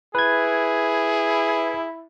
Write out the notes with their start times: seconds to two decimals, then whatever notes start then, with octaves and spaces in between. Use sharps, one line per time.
0.15 E4 G#4 B4 G#6